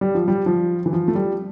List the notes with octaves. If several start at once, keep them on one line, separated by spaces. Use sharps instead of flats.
G3
F3
G3
F3
E3
F3
A3
G3